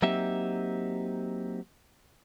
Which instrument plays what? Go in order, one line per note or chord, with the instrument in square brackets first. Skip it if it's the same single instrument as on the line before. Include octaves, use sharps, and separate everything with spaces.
[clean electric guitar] F#3 A#3 C4 D#4 G4 E5